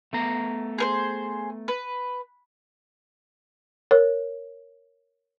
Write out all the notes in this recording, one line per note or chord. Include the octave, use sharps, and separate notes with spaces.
A3 B3 A#5
G#4 A#4 C5
B4
A#4 C#5